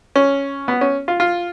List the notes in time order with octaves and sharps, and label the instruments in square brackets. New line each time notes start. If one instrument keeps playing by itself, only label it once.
[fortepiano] C#4
B3
C#4
F4
F4